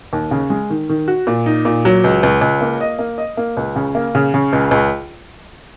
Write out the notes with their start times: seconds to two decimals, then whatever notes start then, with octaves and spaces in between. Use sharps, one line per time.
0.13 D#2
0.31 C#3
0.50 G#3
0.70 D#3
0.89 D#3
1.08 F#4
1.27 A#2
1.46 D#4
1.65 A#2
1.85 F#3
2.04 C#2
2.23 C#2
2.41 C#2
2.61 A#3
2.81 D#5
2.99 A#3
3.18 D#5
3.37 A#3
3.57 C#2
3.76 C#3
3.95 A#3
4.15 C#3
4.34 C#3
4.53 C#2
4.71 C#2